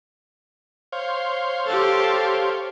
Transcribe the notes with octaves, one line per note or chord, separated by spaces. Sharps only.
C5 C#5 F5
G4 A4